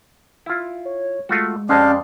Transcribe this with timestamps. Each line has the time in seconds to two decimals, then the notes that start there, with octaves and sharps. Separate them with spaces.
0.46 E4 F4
0.85 C#5
1.29 G#3 A3 F4 F#4
1.69 F2 G#3 C#4 D4 G4 D5 F5